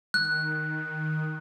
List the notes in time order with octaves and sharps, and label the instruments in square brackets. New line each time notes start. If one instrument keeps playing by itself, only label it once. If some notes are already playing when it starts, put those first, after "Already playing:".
[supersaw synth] D#3 [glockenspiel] F#6